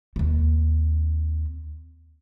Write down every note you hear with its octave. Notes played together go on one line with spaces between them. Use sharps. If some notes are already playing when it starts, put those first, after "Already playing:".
D#2 C4